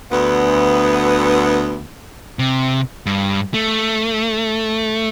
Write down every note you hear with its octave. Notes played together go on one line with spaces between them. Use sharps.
D2 B3
C3
G2
A3